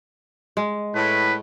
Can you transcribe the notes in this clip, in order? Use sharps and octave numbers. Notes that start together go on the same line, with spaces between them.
G#3
A2 B4